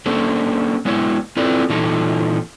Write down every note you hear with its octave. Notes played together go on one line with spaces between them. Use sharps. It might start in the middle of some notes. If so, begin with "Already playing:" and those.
A#3 C#4 D4 A4 C5
G#3 B3 E4 C#5
C4 E4 F4 A4 B4 D5
A#2 E3 D#4 F4 A4